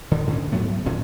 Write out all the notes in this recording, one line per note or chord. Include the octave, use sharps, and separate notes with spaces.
D3 D#3
G#2 D3 C#4
G#2 F#3 A3 B3
A2 D3 D#3 C#4